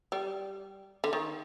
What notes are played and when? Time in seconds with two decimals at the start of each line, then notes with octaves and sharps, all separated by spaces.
0.12 G3
1.04 D3
1.13 D#3